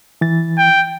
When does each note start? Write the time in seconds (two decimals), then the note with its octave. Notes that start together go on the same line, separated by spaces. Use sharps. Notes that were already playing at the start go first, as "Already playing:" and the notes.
0.21 E3 A6
0.58 G5